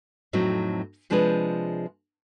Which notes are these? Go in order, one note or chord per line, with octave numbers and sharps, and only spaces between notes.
F2 A2 F#3 C4 D#4
C3 F3 G#3 D4 G#4 B4